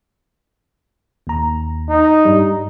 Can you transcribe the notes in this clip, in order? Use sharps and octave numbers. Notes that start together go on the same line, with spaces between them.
D#2 A#5
D#4
G2 G3